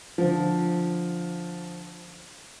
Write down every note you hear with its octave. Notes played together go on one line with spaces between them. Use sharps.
D3 F3